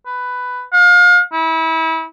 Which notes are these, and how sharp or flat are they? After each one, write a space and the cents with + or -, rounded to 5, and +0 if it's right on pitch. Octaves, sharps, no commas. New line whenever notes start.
B4 +10
F5 +35
E4 -30